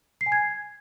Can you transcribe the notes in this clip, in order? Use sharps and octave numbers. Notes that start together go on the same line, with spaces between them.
C7
G#5
G#6